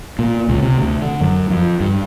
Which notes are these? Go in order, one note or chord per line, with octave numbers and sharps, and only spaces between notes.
A#2
C#2
C3
D2
D3
F#2
F2
G2